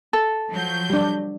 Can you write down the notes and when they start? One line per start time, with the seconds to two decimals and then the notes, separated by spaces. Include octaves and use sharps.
0.13 A4
0.51 F3 F#3 G6
0.90 G3 D4